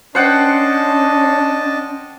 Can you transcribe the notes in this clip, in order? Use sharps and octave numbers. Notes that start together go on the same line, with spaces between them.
C#4 D4 C5 D#5 F#5 G5 A5